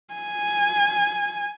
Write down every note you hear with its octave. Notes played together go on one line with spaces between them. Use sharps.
G#5